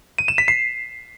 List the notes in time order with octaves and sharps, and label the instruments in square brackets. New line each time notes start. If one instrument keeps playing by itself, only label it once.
[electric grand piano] D#7
E7
B6
C7